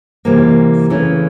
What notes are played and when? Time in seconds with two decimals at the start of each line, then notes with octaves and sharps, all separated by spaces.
0.25 C3 E3 G3 A#3
0.90 C#3 E3 A3 C#4 E4